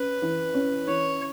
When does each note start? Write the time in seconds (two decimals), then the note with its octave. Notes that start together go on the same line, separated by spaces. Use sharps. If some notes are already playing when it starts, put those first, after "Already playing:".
Already playing: C#4 B4
0.22 E3
0.54 C#4
0.88 E3 C#5